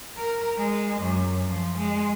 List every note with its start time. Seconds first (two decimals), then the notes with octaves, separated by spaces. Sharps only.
0.17 A#4
0.58 G#3
1.00 F#2
1.46 F3
1.78 G#3